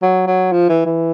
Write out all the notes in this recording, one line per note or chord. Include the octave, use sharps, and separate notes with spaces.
F#3
F#3
F3
E3
E3